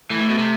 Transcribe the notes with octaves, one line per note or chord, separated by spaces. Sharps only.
E3 A3
A2
B2
C3